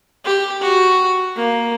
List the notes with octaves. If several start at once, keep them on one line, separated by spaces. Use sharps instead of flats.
G4
F#4
A#3